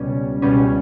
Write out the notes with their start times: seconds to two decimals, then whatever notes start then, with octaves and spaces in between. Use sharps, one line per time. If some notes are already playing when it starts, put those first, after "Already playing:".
Already playing: C#2 B2 G3 C#4
0.42 C#2 B2 G3 C#4